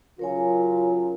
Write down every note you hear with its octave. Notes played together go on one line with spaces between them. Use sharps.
C#3 F#3 F4 A#4 C#5 G#5